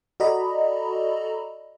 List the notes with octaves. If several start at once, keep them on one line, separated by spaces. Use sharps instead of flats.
F#4 A4 D5 D#5 A#5 B5